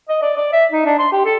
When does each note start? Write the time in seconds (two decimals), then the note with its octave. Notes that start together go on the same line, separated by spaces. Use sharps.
0.09 D#5
0.22 D5
0.37 D5
0.53 E5
0.72 D#4
0.85 D4
0.99 C6
1.12 G4
1.25 A4